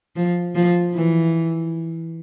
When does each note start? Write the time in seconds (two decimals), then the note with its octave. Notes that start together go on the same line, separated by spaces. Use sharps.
0.16 F3
0.55 F3
0.94 E3